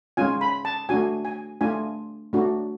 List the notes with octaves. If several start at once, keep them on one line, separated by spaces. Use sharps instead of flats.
G#3 C#4 F4 G#5
B5
A5
A3 D4 F#4 G#5
G#5
A3 D4 F4 G#5
A3 D4 F#4